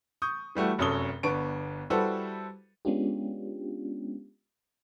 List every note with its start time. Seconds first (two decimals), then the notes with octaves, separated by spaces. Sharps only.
0.22 C#6 D#6 G6
0.55 E3 G3 A3 F#4
0.78 F1 F#2 C#4 A4 D#6 G7
1.23 G1 B3 D4 C#6 D7
1.90 G3 E4 F#4 A4 B4 C5
2.85 G#3 B3 C#4 D4 F4 G4